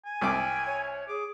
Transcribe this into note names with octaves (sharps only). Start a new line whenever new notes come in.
G#5
C2 G5 D6
C#5
G#4 D6